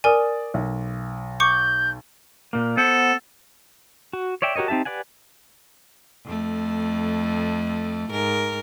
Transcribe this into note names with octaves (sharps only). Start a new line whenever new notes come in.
A#4 D5 G#5 D#6
B1
C#6 D6 G6 C#7
A#2 A#3
B3 A4 C5 F#5
F#4
C#5 D5 E5 G5
F#4 G4 A#4 C#5 D#5
C4 D#4 G4 E5 A5
G4 B4 D5 F#5 G#5
F2 A3
G#2 A#4